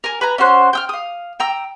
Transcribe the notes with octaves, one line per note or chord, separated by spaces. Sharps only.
A#4 G#5
B4 G#5 A#5
C#4 F#4 C5 F#6
G5 E6 F6
F5 D#6
G5 A#5 E6